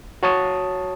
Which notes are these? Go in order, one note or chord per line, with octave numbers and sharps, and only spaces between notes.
F#4 C#5 A5 D#6